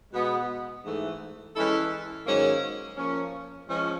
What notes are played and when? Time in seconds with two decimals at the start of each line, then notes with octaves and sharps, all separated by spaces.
0.13 B2 G#3 B3
0.84 G#2 E3 A3
1.56 E3 G#3 C#4 E4 A4
2.26 G#2 D#3 F#3 A#3 C#4
2.97 F3 A#3 C#4
3.69 F3 G#3 C#4